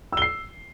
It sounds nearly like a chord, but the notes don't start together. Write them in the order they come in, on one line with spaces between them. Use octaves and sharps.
E6 G7 C7